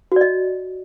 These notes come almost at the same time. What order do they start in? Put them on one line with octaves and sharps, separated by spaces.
F#4 D5 D#5